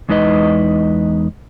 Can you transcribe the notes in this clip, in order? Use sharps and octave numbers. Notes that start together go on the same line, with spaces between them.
E2 G#3 D#4 B4 D#5